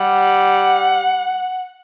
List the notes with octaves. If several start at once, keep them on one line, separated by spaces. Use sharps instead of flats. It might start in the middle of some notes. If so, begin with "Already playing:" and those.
Already playing: G3 F#5